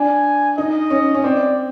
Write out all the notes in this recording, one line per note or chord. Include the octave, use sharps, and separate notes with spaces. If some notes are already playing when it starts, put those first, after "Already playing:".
Already playing: D4 G#5
D#4 D#5
C#4
C#4
C4 D5